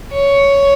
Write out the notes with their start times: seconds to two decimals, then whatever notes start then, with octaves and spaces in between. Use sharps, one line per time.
0.12 C#5